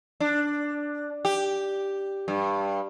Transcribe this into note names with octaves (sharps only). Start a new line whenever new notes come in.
D4
G4
G2